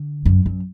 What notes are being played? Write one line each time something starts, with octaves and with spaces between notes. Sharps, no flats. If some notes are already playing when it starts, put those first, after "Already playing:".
Already playing: D3
F#2
F#2